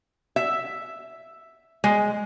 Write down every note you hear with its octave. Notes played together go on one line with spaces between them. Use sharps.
E5
G#3